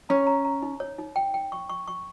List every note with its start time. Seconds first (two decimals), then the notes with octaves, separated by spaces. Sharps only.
0.09 C#4 A#5
0.27 A#5
0.45 A#5
0.62 D#4
0.80 C#5
0.98 D#4
1.16 G5
1.34 G5
1.52 C#6
1.69 C#6
1.88 C#6